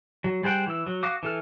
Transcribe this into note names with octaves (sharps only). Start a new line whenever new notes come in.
F#3
G3 G#4 C5 F#5 G5
E3 E6
F#3
F#4 F5 D6 D#6
E3 A4 F6